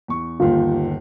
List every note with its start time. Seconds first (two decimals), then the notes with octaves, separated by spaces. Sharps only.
0.08 E2 C#6
0.40 G1 D#2 F4